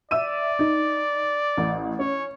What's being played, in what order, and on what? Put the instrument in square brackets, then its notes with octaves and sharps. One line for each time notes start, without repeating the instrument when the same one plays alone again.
[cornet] D5 [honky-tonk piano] E5 E6 D#7
[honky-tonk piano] D#4
A1
[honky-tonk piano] C#4 [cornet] C#5